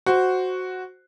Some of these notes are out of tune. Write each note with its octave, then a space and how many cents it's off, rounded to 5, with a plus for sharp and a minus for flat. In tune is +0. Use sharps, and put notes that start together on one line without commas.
F#4 +0 C5 -5